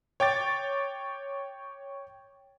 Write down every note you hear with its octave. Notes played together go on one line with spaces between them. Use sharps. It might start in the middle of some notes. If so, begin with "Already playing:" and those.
C#5 G5 D6 A6